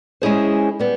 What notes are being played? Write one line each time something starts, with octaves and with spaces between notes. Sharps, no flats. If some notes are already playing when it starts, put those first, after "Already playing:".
G#3 C#4 E4 G#4 C5
G3 B3